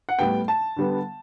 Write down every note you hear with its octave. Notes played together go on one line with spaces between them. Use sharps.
F#5
A2 G3 B3 G5
A5
D3 G3 B3